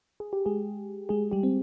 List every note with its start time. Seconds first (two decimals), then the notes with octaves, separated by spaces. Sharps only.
0.20 G#4
0.33 G4
0.46 G#3 G#4
1.09 G#3 G#4
1.32 G3 G4
1.43 C4